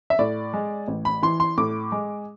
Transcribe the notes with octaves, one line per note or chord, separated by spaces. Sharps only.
E5
A2 D5
G#3
A1
B5
E3 C6
C6
A2 D6
G#3